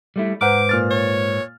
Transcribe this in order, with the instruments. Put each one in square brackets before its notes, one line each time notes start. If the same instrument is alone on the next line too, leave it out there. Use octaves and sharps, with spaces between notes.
[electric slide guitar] G3 A3 E4
[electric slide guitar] G#2 B4 C5 [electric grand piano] F#5 A#5 F6 [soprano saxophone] D6
[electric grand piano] A#2 F6 A6
[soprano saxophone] C#5